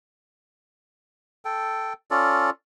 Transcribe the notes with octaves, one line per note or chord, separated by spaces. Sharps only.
A4 G5
C#4 F4 A4 D5